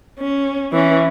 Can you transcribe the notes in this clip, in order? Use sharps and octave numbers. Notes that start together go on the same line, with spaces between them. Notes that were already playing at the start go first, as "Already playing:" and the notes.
C#4
E3 C#4